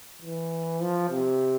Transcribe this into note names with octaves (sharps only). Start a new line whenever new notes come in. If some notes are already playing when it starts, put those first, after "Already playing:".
E3
F3
C3